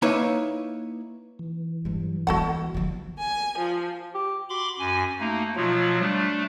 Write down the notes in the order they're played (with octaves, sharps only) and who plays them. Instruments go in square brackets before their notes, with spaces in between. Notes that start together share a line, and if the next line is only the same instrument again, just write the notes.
[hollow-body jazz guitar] A#3 D#4 E4 B4 C#5 E5
[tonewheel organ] E3
[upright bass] G2 F#3
[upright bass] E2 G#3 [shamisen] F#4 A4 F#5
[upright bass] D3 F3
[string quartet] G#5
F3
[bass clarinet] G4
[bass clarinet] F#4 [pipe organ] B5 C6 D6
[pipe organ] F#2 G#5
[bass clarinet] A3 [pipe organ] A#3 D#4
[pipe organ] B2 F3 F#3 [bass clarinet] F4
[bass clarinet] G3 [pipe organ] A3 D4